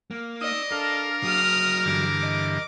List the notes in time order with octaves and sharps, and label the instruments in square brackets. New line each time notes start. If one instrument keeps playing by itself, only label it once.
[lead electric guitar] A#3
[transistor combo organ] D#4 D#6 E6 [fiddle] D5 D#5
[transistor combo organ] D4 F5 [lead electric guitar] A4 [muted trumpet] A#4
[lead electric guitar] F#3 G#4 [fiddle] D#6 F6
[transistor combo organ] G2 D3 E3 [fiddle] D6
[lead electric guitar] D#5